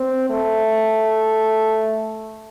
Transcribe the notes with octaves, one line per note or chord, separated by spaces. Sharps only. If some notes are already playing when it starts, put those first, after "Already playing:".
Already playing: C4
A3